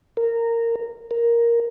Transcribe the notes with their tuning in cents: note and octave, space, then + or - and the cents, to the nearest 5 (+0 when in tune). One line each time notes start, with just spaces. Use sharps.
A#4 -15
A#4 +5